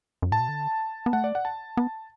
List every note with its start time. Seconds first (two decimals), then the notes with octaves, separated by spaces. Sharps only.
0.22 F#2
0.31 A2 A5
0.40 B2
0.48 D3
1.06 B3
1.13 A3 F#5
1.24 D5
1.35 F#5
1.45 A5
1.77 B3